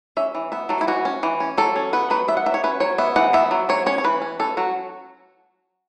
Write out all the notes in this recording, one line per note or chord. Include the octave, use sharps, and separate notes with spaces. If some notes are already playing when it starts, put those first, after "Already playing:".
C#4 E5
E3
B3 E5
F#3 A4
E4
E3 F#4
C#4
E3
C#4
F#3 A4
C#4
B3 B4
F#3 B4
B3 E5
F#5
F#3 E5
C#5
C#4 B4
F#3 C#5
B3 E5
E3 F#5
B3 E5
F#3
F#3 C#5
C#4 C#5
C#5
E3 B4
C#4
C#4 A4
F#3 F#4